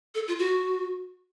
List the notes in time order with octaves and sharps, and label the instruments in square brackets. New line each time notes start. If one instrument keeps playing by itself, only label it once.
[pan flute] A4
F4
F#4